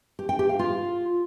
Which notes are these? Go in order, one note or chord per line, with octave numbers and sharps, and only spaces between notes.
G4
G5
G4
F5
F4